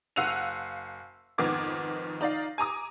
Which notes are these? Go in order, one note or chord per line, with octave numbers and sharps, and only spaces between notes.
F#1 F5 F#5 E6 D#7 F7
F2 G#2 D#3 B3 D6 G#6
D#4 D5 F5
G#5 A#5 D6 D#6